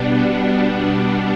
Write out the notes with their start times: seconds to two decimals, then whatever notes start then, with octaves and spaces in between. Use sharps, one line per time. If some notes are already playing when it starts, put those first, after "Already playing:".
Already playing: B2 G3 B3 D4
0.32 D4